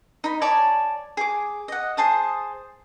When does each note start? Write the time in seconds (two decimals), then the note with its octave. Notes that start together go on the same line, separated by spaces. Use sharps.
0.24 D#4 B5
0.41 C#5 D5 G#5 A5
1.17 G#4 D6
1.68 D#5 F#5
1.97 G#4 C5 A5 D#6